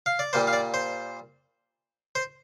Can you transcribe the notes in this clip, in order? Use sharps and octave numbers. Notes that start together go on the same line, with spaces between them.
F5
D5
A#2 G3 A#3 C5
F5
D5
C5
C5